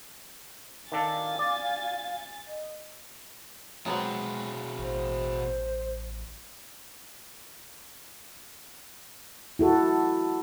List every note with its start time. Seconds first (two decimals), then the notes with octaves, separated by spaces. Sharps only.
0.92 D#3 D4 A4 F5 G#5 A6
1.39 D5
2.47 D#5
3.86 B2 F#3 G#3 B3 C4 G#4
4.79 A1 C5
9.59 E4 F#4 A4